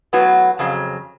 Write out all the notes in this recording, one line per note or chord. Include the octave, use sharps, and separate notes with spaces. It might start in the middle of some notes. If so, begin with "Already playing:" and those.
A2 F#3 B3 F#4
F2 C#3 F#3